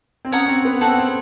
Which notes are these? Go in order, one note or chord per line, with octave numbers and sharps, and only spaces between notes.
C4
C#4 C#5 F#5 A#5 D#6
C4
B3
C4 A4 C#5 F#5
C4